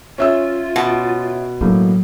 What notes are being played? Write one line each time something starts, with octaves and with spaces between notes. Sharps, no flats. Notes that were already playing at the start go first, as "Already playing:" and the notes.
C#4 F4 E5 E6
B2
A2 F#3 G#3 A#3